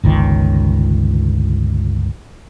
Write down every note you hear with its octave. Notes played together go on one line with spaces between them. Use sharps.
G1 C#2 D#3